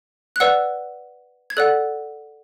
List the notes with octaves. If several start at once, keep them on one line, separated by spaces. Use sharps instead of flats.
F#6
B4 D5 F#5 E6
G#6
A4 D5 F#5 F#6